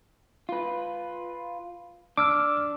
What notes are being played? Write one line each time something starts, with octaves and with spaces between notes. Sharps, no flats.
F4 B4
D4 D6 E6 F6